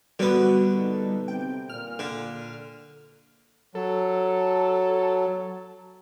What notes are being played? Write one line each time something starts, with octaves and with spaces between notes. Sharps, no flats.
D3 G3 B3 F#4
A#2 D#4 A4
C3 G5
A#2 F6
D3
F#3 A4